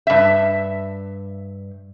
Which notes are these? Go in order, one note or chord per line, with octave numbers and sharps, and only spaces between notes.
G2 E5